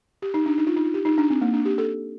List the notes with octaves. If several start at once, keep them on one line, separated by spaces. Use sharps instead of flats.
G4
D#4
D4
D#4
F4
D#4
F4
G4
D#4
D4
C4
A#3
D4
G4
A4